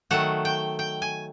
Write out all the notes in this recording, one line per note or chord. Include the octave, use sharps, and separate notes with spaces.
D#3 F#3 A3 F#5
G5
G5
G#5